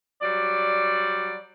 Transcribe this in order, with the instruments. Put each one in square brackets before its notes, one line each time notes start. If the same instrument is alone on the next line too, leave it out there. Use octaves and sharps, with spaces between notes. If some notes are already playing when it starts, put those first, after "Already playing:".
[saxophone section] F#3 G3 D5